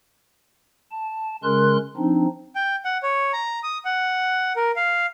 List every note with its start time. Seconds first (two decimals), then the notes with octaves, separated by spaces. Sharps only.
0.92 A5
1.44 C#3 G#3 C#4 A#4 C6 F#6
1.97 F3 C4 D4 D#4
2.55 G5
2.85 F#5
3.03 C#5
3.33 A#5
3.63 D#6
3.85 F#5
4.56 A#4
4.76 F5